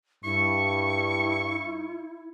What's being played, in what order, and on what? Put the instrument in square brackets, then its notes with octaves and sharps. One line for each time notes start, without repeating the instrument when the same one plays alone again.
[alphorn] G2 [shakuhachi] E4 [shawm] C#6